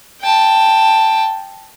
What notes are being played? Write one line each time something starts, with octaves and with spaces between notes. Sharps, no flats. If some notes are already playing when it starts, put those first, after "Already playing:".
G5 A5